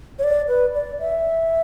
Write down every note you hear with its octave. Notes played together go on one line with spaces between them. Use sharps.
C#5
D5
B4
D5
E5